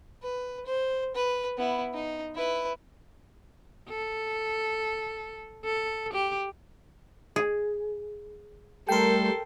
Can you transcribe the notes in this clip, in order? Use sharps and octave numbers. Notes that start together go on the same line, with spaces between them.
B4
C5
B4
B3 E4
D#4
E4 B4
A4
A4
G4
G#4
G3 A3 A4 A#4 G5 C6